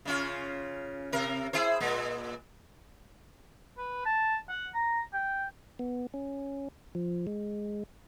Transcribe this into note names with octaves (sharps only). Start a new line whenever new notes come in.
C#3 C#4 F4
C3 A#4
E4 G#4 C5
A#2 G#3
B4
A5
F#5
A#5
G5
B3
C#4
F3
G#3